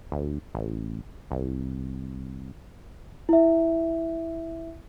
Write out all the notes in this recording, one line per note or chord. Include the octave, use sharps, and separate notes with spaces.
D2
A1
C2
E4 E5